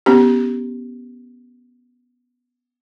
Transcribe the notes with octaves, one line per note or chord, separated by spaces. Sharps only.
B3 C#4 G4